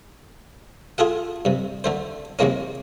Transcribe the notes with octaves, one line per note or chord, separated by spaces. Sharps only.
F4 G#4 A4 F#5
G2 C3
D3 A3 C5
D#2 G#2 C3 G#3 A#3 C#4